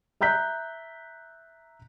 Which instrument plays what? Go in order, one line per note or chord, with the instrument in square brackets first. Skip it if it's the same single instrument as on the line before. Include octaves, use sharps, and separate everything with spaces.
[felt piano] E5 A#5 F#6 G6 B6